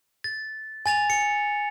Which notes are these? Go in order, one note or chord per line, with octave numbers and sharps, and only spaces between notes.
A6
G#5 A6 F7
C#7